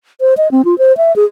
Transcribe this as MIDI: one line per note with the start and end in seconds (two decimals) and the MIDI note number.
0.21 0.34 72
0.37 0.51 75
0.51 0.65 60
0.65 0.78 65
0.78 0.95 72
0.97 1.15 76
1.16 1.25 68